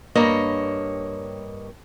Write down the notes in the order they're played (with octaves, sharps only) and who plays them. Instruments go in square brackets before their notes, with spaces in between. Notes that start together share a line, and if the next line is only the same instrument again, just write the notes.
[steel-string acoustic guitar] G2 A#3 C#5 D#5